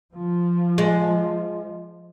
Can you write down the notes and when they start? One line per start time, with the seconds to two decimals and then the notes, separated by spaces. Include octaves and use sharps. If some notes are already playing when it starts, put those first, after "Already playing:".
0.15 F3
0.78 G#3